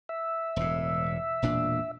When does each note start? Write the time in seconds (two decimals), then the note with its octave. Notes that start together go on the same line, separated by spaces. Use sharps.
0.09 E5
0.56 E1 A2
1.42 E1 A#2 D4